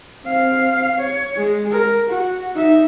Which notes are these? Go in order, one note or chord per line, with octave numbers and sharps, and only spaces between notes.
C4 F5
C#5
G#3
A#4
F#4
D#4 E5